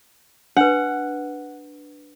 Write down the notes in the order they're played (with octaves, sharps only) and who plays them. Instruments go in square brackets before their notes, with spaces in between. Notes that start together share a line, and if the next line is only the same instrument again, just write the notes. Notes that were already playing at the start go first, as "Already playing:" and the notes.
[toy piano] D4 B4 [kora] F#5